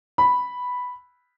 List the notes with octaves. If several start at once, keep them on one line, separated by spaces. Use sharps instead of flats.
B5